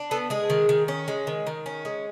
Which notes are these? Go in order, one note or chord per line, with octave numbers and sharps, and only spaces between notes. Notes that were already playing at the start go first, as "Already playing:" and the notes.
Already playing: D4
B3 A4
G#3 G#4
D#3
D#3
C#4
G#3
D#3
D#3
C#4
G#3